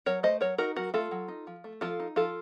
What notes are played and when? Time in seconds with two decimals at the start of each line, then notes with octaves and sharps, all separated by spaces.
0.06 F#3 A#4 C#5
0.23 A3 C5 D#5
0.41 F#3 A#4 C#5
0.58 D#4 F#4 A#4
0.76 F#3 F#4 A#4
0.94 A3 F4 A4
1.11 F#3
1.28 D#4
1.47 F3
1.64 A3
1.81 F3 F4 A4
2.00 D#4
2.16 F3 F4 A4